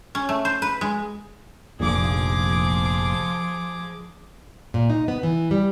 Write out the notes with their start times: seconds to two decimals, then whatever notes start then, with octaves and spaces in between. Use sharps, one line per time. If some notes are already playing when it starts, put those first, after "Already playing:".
0.15 C#4
0.29 A3
0.45 C5
0.62 B4
0.81 G#3
1.80 F1 A#1 A#2 F3 G#4 D6
4.74 A#2
4.90 D#4
5.08 B3
5.23 E3
5.51 G3